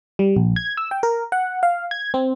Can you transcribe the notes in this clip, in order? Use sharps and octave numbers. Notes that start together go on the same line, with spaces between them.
G3
A#1
G#6
E6
G5
A#4
F#5
F5
G#6
C4